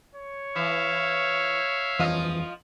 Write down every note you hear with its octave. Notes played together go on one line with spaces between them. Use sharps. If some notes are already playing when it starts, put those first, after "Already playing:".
C#5
E3 E5 F5
D#1 F2 E3 F3 F4 D#5